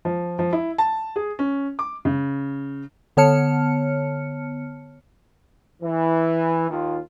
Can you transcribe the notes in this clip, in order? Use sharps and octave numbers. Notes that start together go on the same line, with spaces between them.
F3
F3
E4
A5
G#4
C#4
D6
C#3
D3 B3 C#5 A5 F6 C#7
E3
D#2 F4